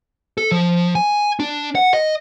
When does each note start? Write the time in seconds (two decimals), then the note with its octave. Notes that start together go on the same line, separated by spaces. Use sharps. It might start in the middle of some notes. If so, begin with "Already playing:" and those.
0.38 A4
0.52 F3
0.95 G#5
1.40 D4
1.75 F#5
1.93 D#5